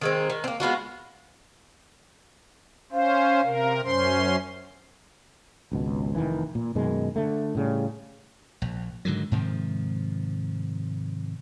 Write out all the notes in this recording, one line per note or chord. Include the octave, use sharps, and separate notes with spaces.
D#3 G#3 C4
D#3
A#3 C4
G#3 B3 F4 F#4
C#4 C5 F5
C3 A#4
F#2 C#4 C5 C6
G#1 C#2 B2
F1 D#3 E3
A#2
F#2 B2 D#3 G#3
D3 A3
A2 C#3 G3
A#1
G#2 D3 D#3 F#3
G#2 C3 D#3 F3